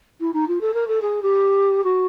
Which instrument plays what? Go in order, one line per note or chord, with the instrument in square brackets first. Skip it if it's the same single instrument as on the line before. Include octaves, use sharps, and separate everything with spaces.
[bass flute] E4
D#4
F4
A4
A#4
A4
G#4
G4
F#4